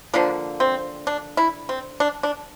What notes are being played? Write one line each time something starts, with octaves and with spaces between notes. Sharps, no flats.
D3 F3 A#3 D4
C4
D4
E4
C4
D4
D4